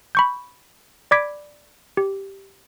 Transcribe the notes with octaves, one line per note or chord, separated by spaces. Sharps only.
B5 C#6 G6
D5 B5 D6 G#6 B6 D7
G4